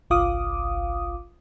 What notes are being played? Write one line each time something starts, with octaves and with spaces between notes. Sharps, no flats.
G1 C2 F4 F5 D6 D#6